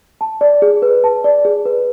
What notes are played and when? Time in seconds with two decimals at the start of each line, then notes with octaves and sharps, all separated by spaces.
0.21 A5
0.41 D5
0.62 G#4
0.82 B4
1.04 A5
1.24 D5
1.45 G#4
1.65 B4